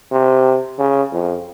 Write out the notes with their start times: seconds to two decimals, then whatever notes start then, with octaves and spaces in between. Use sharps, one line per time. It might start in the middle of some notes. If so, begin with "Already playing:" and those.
0.11 C3
0.79 C#3
1.12 F2